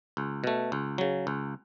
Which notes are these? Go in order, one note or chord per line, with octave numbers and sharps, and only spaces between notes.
C#2
B2 A3
C#2
C#3 F#3
C#2